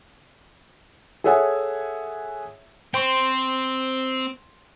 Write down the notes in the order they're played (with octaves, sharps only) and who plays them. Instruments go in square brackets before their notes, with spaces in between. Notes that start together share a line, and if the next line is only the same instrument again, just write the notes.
[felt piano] G#4 A4 C#5 E5 F#5 G#5
[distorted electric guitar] C4 [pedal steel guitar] G5 C6 C#6